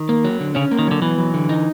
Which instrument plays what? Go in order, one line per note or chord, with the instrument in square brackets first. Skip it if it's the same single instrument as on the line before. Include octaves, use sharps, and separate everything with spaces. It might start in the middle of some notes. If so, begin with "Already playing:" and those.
Already playing: [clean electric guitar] D#3
[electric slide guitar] A#3
F#3
D3
[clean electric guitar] C#3 [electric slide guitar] C#4
[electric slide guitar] A#3
[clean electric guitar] D#3
[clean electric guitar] D3 [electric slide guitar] F#3
[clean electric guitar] E3 [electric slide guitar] B3
[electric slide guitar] F#3
D3
D#4